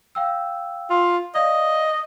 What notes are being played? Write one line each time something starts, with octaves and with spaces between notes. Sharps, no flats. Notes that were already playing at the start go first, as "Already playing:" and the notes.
F5 G5 E6
F4
D5 D#5 F5